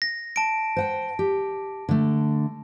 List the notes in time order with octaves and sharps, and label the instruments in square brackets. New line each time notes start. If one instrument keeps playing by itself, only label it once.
[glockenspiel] A#6
A5 D7
[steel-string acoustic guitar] C5 F#5 G5
G4
D3 A3